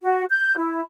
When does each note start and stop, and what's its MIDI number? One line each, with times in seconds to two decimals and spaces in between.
0.02 0.24 66
0.30 0.55 91
0.57 0.81 64